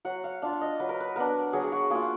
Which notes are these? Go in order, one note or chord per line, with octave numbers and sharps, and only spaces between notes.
F#3 F#5
F5
D4 F4 F5
D#5
F#3 B4
A#4
B4
B3 D4 A#4
F#3 G#4
G#4
F#4
A#3 F4 G#4